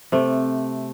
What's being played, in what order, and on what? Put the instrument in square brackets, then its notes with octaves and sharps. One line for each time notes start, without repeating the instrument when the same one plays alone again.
[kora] C3 A3